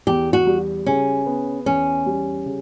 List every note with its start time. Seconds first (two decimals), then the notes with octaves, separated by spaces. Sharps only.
0.07 E2 G4
0.33 F#4
0.47 G3
0.86 C#3 C#4
1.26 B3
1.66 E2 C#4
2.06 G3
2.46 C#3